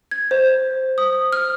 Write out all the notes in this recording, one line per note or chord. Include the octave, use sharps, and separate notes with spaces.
G#6
C5
D#6
F6